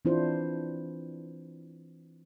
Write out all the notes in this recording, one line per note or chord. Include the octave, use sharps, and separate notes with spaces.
E3 C4 D4 E4 F4 C5